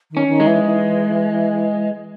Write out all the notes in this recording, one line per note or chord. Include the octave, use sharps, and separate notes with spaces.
D#3
C#4
D#3
G#3
E3
E3